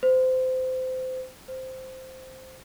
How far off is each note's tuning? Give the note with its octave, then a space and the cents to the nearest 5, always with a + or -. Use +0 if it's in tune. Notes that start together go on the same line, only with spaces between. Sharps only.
C5 -25
C5 -5